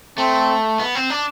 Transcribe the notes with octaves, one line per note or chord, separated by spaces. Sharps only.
A3 C4
B3
C4
D4